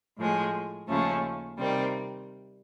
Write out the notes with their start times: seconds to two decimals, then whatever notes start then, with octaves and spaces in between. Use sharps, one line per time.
0.16 A2 F3 G#3
0.87 D#2 C#3 F3 A3 C#4
1.57 C3 D#3 G3 C4